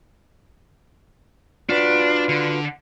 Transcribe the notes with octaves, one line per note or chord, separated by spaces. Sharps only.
D4 F4 F#4 B4
D3